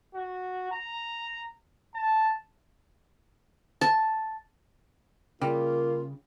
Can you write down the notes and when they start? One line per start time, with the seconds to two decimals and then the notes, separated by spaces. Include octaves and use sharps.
0.14 F#4
0.72 A#5
1.95 A5
3.81 A5
5.41 C#3 G3 A#3 F4